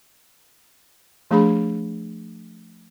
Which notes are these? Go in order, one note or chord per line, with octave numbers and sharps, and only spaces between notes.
F3 A3 D4 G#4 B5